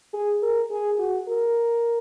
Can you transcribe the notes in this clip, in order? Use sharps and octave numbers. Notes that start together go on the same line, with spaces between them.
G#4
A#4
G#4
F#4
A#4